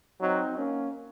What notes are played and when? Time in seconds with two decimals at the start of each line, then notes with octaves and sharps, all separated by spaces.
0.21 F#3 C4 D#4
0.56 A#3 C#4